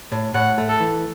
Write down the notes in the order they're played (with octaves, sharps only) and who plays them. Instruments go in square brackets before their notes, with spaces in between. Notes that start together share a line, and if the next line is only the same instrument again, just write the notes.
[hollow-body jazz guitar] A2
[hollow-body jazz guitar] A2 [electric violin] F#5
[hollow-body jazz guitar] A3
[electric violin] A4
[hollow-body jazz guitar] E3